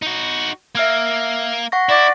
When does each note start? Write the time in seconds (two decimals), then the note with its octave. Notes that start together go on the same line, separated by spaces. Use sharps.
0.02 D#4 F#4
0.75 A#3 E5 F6 G#6
1.72 F#5 C#6 A#6
1.89 E4 D5